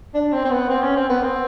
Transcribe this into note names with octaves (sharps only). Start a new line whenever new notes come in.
D4
C4
C4
B3
C4
C#4
C4
B3
C4